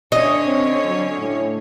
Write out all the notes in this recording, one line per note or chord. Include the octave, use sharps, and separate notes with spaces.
D3 C#4 C#5 D#5
C4
F#3
A2